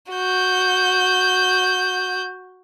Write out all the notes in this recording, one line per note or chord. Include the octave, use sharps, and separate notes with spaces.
F#4 G6